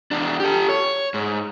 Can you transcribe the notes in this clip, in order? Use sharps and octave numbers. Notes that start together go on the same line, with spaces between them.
E2 D4
G4 A4
C#5
G#2